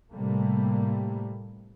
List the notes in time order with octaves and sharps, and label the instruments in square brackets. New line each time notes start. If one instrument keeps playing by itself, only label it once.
[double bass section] A2 C3 G3 A3 A#3